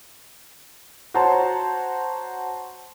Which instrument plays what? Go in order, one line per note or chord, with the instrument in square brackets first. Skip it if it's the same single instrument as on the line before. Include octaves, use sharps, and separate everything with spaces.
[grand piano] F#4 C5 C#5 A5 A#5 C6